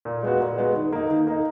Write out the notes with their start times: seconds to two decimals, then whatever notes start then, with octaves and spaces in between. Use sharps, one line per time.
0.05 A#2
0.23 G#3 B3 F#4
0.40 A#2
0.58 G#3 B3 F#4
0.75 D#3
0.92 A#3 D#4
1.10 D#3
1.27 A#3 D#4